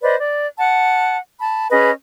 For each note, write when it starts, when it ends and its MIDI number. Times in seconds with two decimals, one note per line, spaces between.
0.02 0.16 71
0.02 0.16 72
0.02 0.16 74
0.02 0.16 75
0.19 0.45 74
0.58 1.17 78
0.58 1.17 81
1.39 1.67 81
1.39 1.67 83
1.70 1.90 61
1.70 1.90 68
1.70 1.90 71
1.70 1.90 75